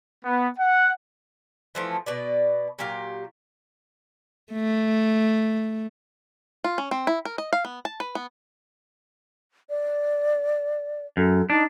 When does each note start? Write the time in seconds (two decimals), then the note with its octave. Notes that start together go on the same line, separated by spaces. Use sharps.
0.24 B3
0.58 F#5
1.75 E3 F3 A3
2.06 B2 B4 D5
2.79 A#2 F#3 G4 F5
4.52 A3
6.64 F4
6.78 C#4
6.91 C4
7.07 E4
7.25 A#4
7.38 D#5
7.53 F5
7.65 B3
7.85 A5
8.00 B4
8.15 B3
9.70 D5
11.17 F#2 A4
11.50 D4 D#4